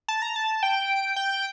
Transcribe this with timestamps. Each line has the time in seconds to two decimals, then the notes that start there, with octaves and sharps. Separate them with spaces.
0.08 A5
0.22 A#5
0.36 A5
0.63 G5
1.16 G5